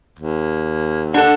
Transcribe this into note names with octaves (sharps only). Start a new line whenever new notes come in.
D#2
D4 A4 F#5